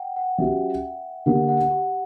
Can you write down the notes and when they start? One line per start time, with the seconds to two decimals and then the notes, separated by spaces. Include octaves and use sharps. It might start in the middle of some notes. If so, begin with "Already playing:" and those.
Already playing: F#5 G5
0.16 F#5
0.38 F#3 C#4 G4 E5
1.26 D3 A#3 D4 G4 F#5
1.49 F#5
1.70 G4